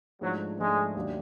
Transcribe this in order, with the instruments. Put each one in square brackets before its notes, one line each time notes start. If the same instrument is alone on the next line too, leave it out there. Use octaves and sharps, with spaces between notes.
[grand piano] G#2 F3 A3 D4 [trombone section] F#3
[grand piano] G#2 F3 A3 D4 [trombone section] G#3
[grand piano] D#2 D#3 F#3 A3 D4